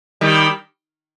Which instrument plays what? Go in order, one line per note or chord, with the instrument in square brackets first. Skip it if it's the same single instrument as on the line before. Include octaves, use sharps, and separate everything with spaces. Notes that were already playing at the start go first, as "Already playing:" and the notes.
[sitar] D#3 G3